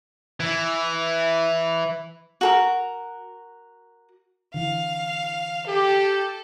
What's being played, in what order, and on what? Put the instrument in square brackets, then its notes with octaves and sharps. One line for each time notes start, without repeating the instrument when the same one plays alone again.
[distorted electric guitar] E3
[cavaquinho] F#4 A4 A#4
[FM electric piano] D3 E3 [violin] F5
[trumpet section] G4 [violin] A4